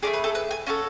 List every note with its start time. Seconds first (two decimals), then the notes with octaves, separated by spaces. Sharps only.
0.03 A3 C#4 G#4 D5
0.14 B4
0.24 A4
0.35 B4
0.51 G#5
0.67 C#4 F#4 A4 A5